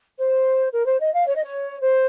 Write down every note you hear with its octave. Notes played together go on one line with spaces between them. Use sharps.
C5
A#4
C5
D#5
F5
C#5
D#5
C#5
C5